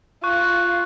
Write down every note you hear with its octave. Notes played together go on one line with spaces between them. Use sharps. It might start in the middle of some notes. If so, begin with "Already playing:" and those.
F4 C#6 F#6